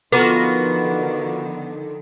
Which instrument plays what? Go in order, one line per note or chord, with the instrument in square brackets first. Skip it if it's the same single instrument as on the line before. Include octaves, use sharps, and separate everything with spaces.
[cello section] D3 D#3 F3 [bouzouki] B3 [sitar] F4 F#4 A#4 [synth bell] A4